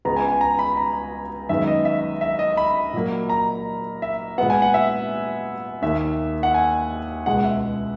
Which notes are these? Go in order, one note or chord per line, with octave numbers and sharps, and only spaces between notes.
C#2 C#3 G#3 B3 A#5
G#5
G#5
A#5
B5
A#5
F#2 D#3 G#3 B3 E5
D#5
E5
E5
D#5
B5
A#2 F#3 A#3
A#5
E5
A#2 G#3 B3 F#5
G#5
F#5
E5
D#2 D#3 A#3 E5
F#5
G#5
C#2 B2 G#3 F#5
E5